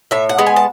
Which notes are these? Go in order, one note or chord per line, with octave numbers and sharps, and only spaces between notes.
A2 E5
F#5
G#3 B3
G#5
A5